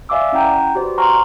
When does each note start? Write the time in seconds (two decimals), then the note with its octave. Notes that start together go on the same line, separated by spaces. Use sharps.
0.09 D5 E5 F5 G#5 D6 E6
0.32 C#4 E4 F#5 G5 A#5 G6
0.75 F#4 G4 B4 C5 D5
0.98 C5 F#5 A#5 C6 C#6 F6